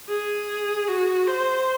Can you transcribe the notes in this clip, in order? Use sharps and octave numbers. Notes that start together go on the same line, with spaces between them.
G#4
F#4
C5